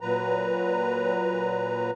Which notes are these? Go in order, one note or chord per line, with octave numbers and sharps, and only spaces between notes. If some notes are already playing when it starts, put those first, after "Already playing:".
A#2 F#3 B4 A#5